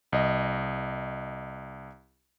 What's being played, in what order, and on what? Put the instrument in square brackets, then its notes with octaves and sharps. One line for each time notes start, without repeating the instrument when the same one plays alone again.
[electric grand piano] C2 D#5